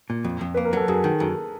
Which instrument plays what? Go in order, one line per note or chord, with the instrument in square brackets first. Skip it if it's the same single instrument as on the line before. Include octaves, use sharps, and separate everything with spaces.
[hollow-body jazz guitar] A#2
F2
F2
[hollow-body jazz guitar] A#3 [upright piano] B4
[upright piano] A#4
[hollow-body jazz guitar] F#3 [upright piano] A4
[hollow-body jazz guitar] F#2 [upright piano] G#4
[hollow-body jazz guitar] D#3
[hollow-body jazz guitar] F#2 [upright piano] A4